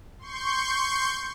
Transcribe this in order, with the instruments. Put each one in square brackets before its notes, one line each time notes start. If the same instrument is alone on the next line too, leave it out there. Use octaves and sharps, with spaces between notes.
[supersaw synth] C6 C#6 G6